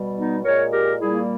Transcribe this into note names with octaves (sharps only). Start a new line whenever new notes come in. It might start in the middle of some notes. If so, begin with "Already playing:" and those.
Already playing: B2 G3
B3 D#4
A#2 G#3 A#4 C#5
G4 A#4
A#2 G3 A#3 E4 G#4